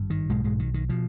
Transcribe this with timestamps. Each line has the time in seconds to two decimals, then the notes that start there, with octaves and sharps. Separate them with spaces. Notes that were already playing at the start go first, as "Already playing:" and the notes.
Already playing: G#1 G2
0.10 D#3
0.29 B1 G#2 B2 G#3
0.44 G#2 G#3
0.59 D#3
0.74 D#3
0.89 B2 F3